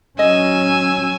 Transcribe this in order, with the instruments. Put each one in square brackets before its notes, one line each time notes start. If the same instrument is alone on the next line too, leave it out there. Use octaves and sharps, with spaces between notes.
[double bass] F#3 C#4 [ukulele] D#5 [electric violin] G#5 E6